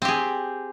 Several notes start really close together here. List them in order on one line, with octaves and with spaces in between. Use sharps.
C4 G4 G#4